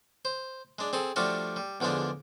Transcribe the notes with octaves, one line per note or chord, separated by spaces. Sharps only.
C5
G#3 D4
C4 G#4 A4
F3 G3 A3 D4 F4 F#4
G3
E2 D3 F3 G#3 D4